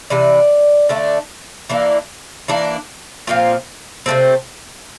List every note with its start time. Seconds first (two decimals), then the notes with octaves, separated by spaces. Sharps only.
0.10 C3 E3 D5
0.89 D3 A3 D4
1.70 E3 A#3 D4
2.48 E3 A#3 D4
3.27 A#2 F3 A3 C4 F4
4.06 C3 F3 A3 C4